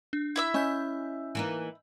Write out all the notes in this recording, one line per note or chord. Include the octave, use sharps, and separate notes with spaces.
D4
E4 E5 E6
C#4 D#5 G#5 G6
E3 A#3 D#4